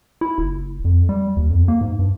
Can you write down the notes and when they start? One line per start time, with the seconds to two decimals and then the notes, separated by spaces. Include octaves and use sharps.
0.21 E4
0.38 F#1
0.85 F2
1.09 G3
1.37 D#2
1.50 F2
1.68 A#3
1.81 G#2
1.99 G2